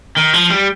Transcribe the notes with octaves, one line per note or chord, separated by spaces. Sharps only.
D#3
F3
G3